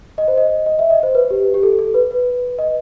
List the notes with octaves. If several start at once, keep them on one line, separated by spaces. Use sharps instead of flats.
D#5
C5
D#5
D#5
E5
D#5
C5
B4
G4
G4
A4
A4
B4
B4
D#5